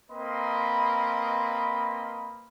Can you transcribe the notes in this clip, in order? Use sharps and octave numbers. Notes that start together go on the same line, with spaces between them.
A#3 C4 B4 D#5 B5 C6